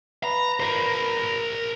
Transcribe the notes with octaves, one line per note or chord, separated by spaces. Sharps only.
B4 A#5
A#4 C5